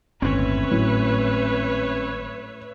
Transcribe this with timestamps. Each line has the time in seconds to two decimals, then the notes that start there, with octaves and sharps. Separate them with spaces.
0.22 G1 D#2 A2 C4 C#4 B4 C#5 E5
0.71 G#1 A2 F#3